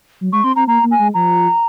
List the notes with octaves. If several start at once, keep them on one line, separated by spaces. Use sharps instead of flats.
F#3
G#3 C#6
C4 C6
C4 A#5
A#3 A#5
A#3
G#5
G#3
F3 A#5